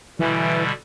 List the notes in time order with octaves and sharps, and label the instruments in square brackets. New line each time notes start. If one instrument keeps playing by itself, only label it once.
[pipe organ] B2 D3 G3 [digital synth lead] E3